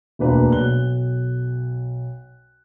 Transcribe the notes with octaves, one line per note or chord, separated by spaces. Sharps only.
E1 D2 A#3 D4 B4
B1 F#6 G7